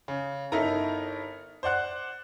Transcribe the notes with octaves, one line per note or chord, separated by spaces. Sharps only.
C#3
G1 D#4 E4 A4 A#4 A#5
C5 D5 F#5 F#6